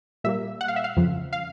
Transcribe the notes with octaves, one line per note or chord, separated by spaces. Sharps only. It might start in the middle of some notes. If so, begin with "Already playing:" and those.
A#2 G3 A#3 E5
F#5
F5
E5
F5
F2 C#3 F3
F5